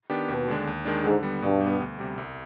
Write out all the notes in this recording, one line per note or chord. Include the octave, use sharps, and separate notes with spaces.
D#3 B3 D4 G4
D#2 B2
D3 G#3 D4
D#2
D#3 G#3 D4
G#2 D3
G3 B3
G2 B2
G3
B3
D2
C3 G3
C2